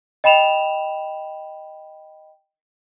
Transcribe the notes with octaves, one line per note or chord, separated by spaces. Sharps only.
D#5 G5 B5 E7 F7